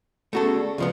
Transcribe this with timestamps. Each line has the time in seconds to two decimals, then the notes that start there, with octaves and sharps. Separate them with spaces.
0.33 A3 B3 C#4 F#4 G#4 A4
0.54 D5
0.78 C#2 F3 B3